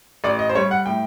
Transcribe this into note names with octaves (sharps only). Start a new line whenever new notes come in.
A1 D5
D#5
C5
G3 C#5
F#5
A2 G5